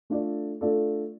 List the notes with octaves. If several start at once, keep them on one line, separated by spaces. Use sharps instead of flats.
A3 D4 F4 A4 D5
A3 D4 F4 A4 D5